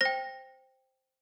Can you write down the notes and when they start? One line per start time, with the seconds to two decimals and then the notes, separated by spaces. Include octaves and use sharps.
0.01 C5 G5 A#6